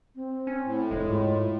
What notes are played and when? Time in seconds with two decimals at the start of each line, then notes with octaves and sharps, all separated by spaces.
0.15 C4
0.47 C#4
0.64 A2
0.91 F1 G#3
1.10 G#2 F4